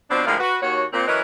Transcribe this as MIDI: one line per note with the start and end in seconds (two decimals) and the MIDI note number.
0.09 0.26 47
0.09 0.26 53
0.09 0.26 60
0.09 0.26 62
0.26 0.35 45
0.26 0.35 50
0.26 0.35 53
0.26 0.35 56
0.26 0.35 70
0.26 0.35 77
0.39 0.56 66
0.39 0.56 71
0.62 0.84 39
0.62 0.84 66
0.62 0.84 73
0.92 1.05 46
0.92 1.05 60
1.07 1.20 52
1.07 1.20 54
1.07 1.20 61
1.07 1.20 70
1.07 1.20 71
1.07 1.20 75